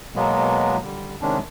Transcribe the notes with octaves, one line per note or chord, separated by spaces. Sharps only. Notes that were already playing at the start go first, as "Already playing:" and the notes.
B2 F#3 G#3 A#3 B3
D3 G3
C3 D#3 G#3 C#4 D4